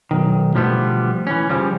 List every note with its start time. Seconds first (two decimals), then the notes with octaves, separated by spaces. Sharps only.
0.11 B1 D#3
0.54 B2 D3 F3 G3 A3 B3
1.27 E3 C#4
1.49 C#3 F3 G3